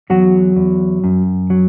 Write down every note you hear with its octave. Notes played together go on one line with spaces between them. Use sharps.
E2 F#3 F#4
E2
F#2
F#3